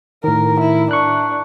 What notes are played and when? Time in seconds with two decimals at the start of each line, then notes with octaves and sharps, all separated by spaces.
0.24 A2 D#3 A#4
0.60 E4
0.91 D4 C#6 F#6